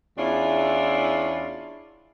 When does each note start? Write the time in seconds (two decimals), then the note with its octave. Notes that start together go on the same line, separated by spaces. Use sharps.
0.18 E2 C#4 D4 E4 F4